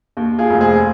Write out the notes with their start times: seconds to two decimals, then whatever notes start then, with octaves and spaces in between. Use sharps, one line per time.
0.17 D#2
0.39 F4 G#4
0.50 F1
0.60 G#4 C5